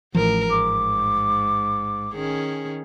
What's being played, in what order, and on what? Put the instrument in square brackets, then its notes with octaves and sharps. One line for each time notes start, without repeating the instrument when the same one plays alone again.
[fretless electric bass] A1 E3 F3 [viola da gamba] A2 A#4
[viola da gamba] G#2 [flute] D6
[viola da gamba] D#3 C#4 G#4